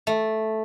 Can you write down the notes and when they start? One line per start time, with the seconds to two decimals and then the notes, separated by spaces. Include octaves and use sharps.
0.07 A3